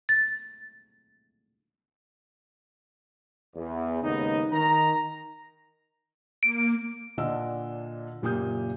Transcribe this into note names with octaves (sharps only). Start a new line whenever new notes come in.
A6
E2
D#2 G#2 C#3 B3 D#4
D#3 A#5
A#3 D7
A#2 D3 D4 D#5 E6
F#1 A#2 A#3 G4 D#6 G6